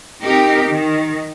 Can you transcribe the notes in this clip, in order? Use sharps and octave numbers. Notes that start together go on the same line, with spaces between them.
C4 D#4 G4 A#4
D#3